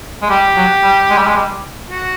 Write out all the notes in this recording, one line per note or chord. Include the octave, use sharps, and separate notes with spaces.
G#3
G3 G4
F#3
G3
G#3
G3
G#3
G3
F#4